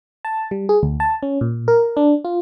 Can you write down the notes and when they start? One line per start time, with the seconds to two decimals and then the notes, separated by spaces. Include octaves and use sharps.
0.25 A5
0.51 G3
0.69 G#4
0.83 D2
1.00 A5
1.23 C#4
1.41 A#2
1.68 A#4
1.97 D4
2.25 F4